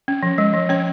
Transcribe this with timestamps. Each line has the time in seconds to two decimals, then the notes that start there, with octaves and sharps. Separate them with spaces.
0.08 C#4
0.23 F3
0.38 G#3
0.53 F3
0.69 C#4 C#5